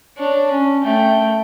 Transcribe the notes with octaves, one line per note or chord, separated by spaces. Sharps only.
D4 C#5
C#4
A3 G5